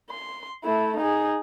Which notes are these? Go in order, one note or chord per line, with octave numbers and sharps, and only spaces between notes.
C6
A3 E4
D#4 G#4